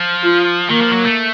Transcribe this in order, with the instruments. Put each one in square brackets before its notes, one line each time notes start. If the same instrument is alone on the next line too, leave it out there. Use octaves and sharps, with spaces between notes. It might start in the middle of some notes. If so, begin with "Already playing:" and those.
Already playing: [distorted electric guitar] F3
[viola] F4
[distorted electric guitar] D#3 [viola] A#3
[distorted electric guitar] F3
F#3
A3